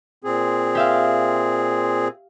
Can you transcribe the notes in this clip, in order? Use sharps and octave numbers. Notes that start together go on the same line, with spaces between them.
A#2 C4 G#4
G4 E5 F5